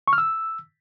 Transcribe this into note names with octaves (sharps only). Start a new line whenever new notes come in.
C#6
F6
E6